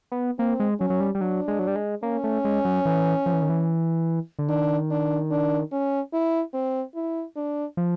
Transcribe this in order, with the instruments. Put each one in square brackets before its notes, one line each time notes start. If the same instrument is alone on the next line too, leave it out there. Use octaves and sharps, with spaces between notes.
[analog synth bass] B3
[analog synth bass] A#3 [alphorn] C4
[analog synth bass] G#3
[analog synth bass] F#3 [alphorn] C#4
[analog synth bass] F#3
G3
G3
[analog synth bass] F#3 [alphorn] D4
[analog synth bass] G#3
F#3
G3
G#3
[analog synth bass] A#3 [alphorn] C#4
[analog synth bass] A3
G#3
F#3
E3
F3
E3
D#3
E3
D3
[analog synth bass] D#3 [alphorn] D4
[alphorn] D4
D4
C#4
E4
C4
E4
D4
[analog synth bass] F3